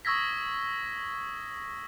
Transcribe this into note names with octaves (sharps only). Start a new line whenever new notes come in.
C#6 D#6 E6 G#6 A#6 B6